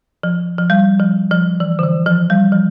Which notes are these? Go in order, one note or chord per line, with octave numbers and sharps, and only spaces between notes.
F3
F3
G3
F3
F3
E3
D3
E3
F3
G3
F3